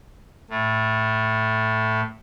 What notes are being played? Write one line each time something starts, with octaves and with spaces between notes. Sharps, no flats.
A2 A3